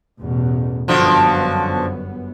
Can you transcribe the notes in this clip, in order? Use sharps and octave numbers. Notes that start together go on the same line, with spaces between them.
A1 E2 B2
G1 F#2 D3 F3 B3 F#4